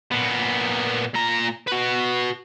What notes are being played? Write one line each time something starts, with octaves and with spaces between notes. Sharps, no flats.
A#2 B3
A#2 A#5
F#4 B4